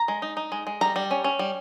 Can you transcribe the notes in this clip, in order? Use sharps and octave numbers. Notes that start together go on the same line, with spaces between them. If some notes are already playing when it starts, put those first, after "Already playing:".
Already playing: A#5
G#3
D#4
D#4
G#3
G#3
G3 A#5
G3
C#4
C#4
G3